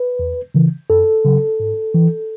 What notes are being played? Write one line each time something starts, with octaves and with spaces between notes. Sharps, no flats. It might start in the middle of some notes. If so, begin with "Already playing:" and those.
Already playing: B4
E2
C#3 E3
F#2 A4
C#3 F#3
G#2
E3